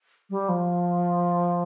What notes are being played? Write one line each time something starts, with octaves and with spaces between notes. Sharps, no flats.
G3
F3